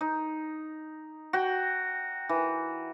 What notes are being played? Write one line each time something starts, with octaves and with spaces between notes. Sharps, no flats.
D#4
F#4 G5
E3